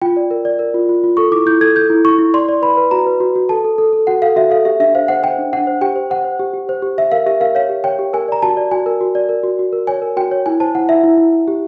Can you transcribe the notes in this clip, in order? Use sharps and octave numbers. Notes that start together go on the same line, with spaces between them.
F4 G5
D5
A#4
D5
A#4
F4
F4
F4
A4 C#6
E4 D6
E4 G6
A4 G#6
A4 G6
E4
E4 C#6
E4
D5 C6
D5
B4 B5
B4
F#4 A#5
B4
F#4
F#4
A4 A5
A4
A4
A4
F#4 F#5
A4 F5
F#4 E5
A4 F5
G4 E5
D4 E5
C5 F5
C5 F#5
C5 G5
D4
D4 F#5
C5
G4 G5
C5
C5 F#5
C5
G4
G4
C5
G4
G4 E5
A#4 F5
G4 E5
A#4 F5
C#5 F5
G4
C#5 G5
G4
A#4 G#5
D5 A#5
F#4 A5
D5
F#4 G#5
A#4
F#4
D5
A#4
F#4
F#4
A#4
C#5 G#5
A#4
F#4 G5
C#5
E4 G#5
C5 A5
E4 F#5
E4 E5
E4
E4
E4
G4